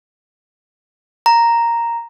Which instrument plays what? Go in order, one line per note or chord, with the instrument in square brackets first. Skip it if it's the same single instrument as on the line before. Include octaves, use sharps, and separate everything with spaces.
[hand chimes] A#5